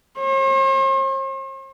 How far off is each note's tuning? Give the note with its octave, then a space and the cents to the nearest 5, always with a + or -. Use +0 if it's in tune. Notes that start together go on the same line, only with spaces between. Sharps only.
C5 +45